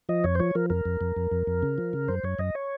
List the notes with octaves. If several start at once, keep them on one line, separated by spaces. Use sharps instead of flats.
F3 D#5
F2 C#5
C5
F3 C#5
F3 A#4
F2 A#4
F2
F2
F2
F2
F2
C#3
F3
C#3
F#2 C5
F#2 C#5
F#2 D#5
C#5